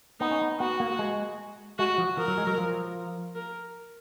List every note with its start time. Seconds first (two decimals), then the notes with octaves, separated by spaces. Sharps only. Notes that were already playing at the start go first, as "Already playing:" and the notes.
0.20 B3 D#4
0.31 C#4
0.42 B3
0.60 B3 F#4
0.80 A#3
0.99 G#3
1.79 G#3 F#4
1.98 F3
2.18 F3 A#4
2.28 F#3
2.38 G#3
2.47 F#3
2.58 F3
3.36 A#4